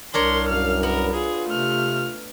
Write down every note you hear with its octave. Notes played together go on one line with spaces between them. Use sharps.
C2 D4 A#4 C#5 C6
F#2 F5 F6
B3 A#4
F4 G#4
C3 A3 F6